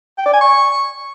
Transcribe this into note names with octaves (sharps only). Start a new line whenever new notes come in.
G5
D5
G#5
C#6